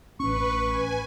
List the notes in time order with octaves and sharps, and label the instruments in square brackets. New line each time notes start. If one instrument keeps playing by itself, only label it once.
[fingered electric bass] A1 C#4 [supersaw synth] B4 [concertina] C#6
[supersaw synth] G#5